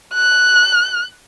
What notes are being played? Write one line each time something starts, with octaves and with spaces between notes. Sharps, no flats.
F#6